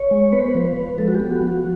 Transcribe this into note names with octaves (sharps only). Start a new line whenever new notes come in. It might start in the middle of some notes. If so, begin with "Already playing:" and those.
Already playing: C#5
G#3
B3 B4
C5
B4
F3 C5
B4
F3
G#3 A4
F#4
G4
B3
F#4
F3
F#4